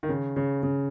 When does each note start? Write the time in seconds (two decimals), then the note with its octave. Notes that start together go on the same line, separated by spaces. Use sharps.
0.03 D#3
0.09 C#3
0.36 C#3
0.63 C#3